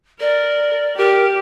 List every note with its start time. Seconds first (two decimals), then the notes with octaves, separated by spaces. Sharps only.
0.20 A#4 D5
0.97 G4 A#4